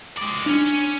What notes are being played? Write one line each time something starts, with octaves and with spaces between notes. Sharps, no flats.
G#3 D5
C#4 D4